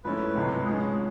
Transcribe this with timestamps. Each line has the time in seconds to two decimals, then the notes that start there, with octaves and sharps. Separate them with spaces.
0.04 G#2 F3 A3 C#4 E4 B4
0.36 C#2 C3 F3 G#3
0.66 G#2 F3 G#3 C#4 G#4